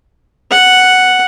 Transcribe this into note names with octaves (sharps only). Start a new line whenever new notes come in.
F#5